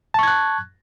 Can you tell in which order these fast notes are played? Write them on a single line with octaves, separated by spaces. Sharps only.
A5 C#6 G#6 F#6